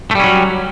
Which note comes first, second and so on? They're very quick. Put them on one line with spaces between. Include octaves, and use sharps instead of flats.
A3 G3 C#4 F#3